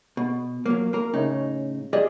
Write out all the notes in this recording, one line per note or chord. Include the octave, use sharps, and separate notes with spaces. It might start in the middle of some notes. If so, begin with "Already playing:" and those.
B2
F#3 A#3
A#3 A#4
A2 C#3 D#4
G4 G#4 D5 D#5